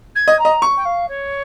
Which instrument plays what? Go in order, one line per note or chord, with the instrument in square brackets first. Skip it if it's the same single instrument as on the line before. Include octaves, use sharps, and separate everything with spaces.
[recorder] G#6
[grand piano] D#5
[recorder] A#5
[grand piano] D#5
C#6
[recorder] G5
F5
C#5